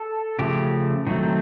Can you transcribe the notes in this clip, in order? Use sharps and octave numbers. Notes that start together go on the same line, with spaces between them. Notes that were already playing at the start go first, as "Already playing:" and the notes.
Already playing: A4
C#3 F3 A3 G4
D#3 F#3 A3 C4